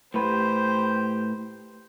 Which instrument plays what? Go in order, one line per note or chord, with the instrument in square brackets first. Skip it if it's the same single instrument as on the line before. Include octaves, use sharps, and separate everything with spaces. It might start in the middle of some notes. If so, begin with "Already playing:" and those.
[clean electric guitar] A2 B4 [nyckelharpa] G4 C5